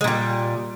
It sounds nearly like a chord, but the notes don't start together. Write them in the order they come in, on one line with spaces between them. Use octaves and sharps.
G#3 A#2 G3